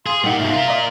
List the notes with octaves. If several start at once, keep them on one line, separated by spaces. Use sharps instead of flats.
G#4 F5 C6
A#2 G3 D#4 G4 F#5
G#2 B2 E5 F5
C2 F4 A#4
D5 D#5 A#5